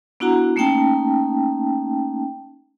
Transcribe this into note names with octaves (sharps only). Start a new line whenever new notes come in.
B3 D4 E4 F#4 F#5 A#5
A3 A#3 C#4 D#4 G5 A5